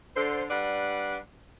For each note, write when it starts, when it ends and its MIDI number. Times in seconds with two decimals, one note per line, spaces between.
0.16 0.44 50
0.16 0.44 72
0.50 1.17 55
0.50 1.17 62
0.50 1.17 71
0.50 1.17 78